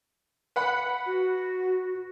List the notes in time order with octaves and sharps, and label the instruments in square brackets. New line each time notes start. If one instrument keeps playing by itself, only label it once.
[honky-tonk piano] B4 F#5 B5
[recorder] F#4